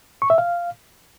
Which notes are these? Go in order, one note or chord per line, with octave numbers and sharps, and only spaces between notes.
C#6
E5
F5